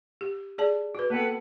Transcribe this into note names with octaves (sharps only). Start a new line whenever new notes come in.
G4
G#4 D5 A5
F#4 B4
A#3 B3 A4 B4 F#5